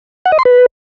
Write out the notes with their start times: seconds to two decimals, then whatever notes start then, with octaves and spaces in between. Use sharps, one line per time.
0.26 F#5
0.32 D#5
0.39 C6
0.45 B4